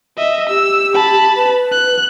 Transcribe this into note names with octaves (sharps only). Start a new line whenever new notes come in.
D#5 E5
G4 E6
A5 B5
B4
F#6